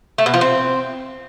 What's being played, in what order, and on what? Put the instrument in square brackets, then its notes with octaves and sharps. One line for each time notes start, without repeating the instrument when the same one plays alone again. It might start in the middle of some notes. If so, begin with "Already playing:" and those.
[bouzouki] A3
B2
F3
C4